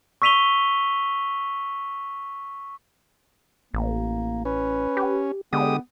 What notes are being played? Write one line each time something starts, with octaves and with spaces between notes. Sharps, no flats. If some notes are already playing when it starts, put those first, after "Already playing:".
C#6 E6 B6 D#7 F7 G7
A1 A#3
C#4 B4
G4
D3 G#3 B3 G4 D#6